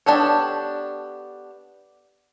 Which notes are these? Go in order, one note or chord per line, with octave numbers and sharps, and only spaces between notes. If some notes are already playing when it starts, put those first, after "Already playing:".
B3 D4 G4 A4 C#5